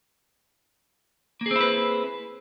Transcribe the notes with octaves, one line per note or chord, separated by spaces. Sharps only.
A#3 C4 E4 G#4 B4